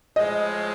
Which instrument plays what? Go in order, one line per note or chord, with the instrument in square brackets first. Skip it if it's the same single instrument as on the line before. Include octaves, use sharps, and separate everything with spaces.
[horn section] A2 F3 G#3 [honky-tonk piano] D#5